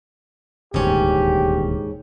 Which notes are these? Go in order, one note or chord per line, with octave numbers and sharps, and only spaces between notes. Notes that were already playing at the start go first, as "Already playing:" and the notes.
D#1 D2 G#2 C#4 G4